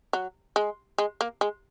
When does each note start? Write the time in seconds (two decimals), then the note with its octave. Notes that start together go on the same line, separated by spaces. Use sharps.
0.13 F#3
0.56 G#3
0.98 G#3
1.21 A#3
1.41 G#3